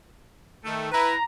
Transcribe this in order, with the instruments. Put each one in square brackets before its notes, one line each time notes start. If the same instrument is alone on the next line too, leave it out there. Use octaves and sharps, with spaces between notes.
[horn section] D#3 A3
[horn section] E4 B4 [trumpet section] A#5